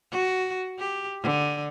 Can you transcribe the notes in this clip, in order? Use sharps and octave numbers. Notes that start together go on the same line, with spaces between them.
F#4
G4
D3